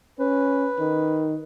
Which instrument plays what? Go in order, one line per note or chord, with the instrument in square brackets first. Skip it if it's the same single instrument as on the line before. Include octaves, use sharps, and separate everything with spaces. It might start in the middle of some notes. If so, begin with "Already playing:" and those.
[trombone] C#4 [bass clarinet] B4
[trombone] D#3